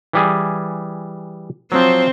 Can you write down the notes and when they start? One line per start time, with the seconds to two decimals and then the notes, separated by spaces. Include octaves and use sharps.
0.13 E3 G3 G#4
1.72 F3 F#3 C4 C5